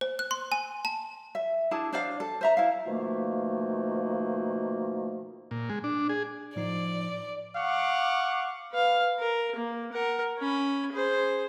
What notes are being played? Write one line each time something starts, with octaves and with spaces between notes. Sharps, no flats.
C5
F#6
C6
G#5
A5
E5
D4 E4 G#4 A5
D4 C5 D5 F5
A4
C5 E5 A#5
E4 F5
B2 D#3 F3 A3 A#3
A#2
G#3
D4
G#4
A2 F3 D#4 D5
F5 F#5 C#6 D6
B4 F5
A#4
A#3
A#4 F#5
C#4 B5
G#4 C5